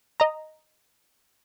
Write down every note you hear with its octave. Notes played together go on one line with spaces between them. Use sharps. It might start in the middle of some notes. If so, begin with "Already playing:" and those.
D#5 A#5